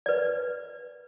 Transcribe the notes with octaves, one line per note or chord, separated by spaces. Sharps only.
B4 D5